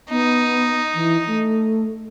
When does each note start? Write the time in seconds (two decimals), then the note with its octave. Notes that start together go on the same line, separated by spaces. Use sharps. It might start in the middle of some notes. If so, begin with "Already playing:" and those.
0.11 B3 D#4
0.94 E3
1.27 A3